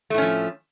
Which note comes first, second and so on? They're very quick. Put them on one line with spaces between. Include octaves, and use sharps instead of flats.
A3 A2 C#4 F3